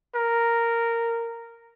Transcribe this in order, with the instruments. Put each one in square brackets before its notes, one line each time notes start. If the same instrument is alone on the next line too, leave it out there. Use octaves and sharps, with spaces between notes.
[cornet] A#4